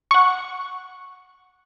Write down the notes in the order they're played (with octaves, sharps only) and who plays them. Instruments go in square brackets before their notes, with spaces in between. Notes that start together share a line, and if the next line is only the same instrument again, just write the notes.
[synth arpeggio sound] F#5 C#6